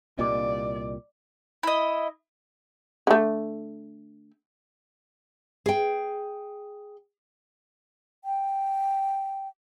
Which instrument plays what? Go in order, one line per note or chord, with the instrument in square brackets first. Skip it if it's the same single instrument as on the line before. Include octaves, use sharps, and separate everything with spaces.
[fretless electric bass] C2 A#2 G3 [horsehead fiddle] D5 [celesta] D#5 D6
[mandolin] E4 D#5
[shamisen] D3 A3
[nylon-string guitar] G#4 G5
[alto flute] G5